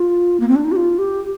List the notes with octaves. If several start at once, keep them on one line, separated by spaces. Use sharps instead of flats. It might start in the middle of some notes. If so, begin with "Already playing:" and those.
Already playing: F4
A#3
C4
D4
D#4
G4
F4
G4